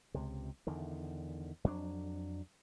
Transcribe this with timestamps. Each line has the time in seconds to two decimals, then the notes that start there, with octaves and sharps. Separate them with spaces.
0.14 C#2 C3
0.67 E2 D3 D#3
1.64 F2 F#3 D4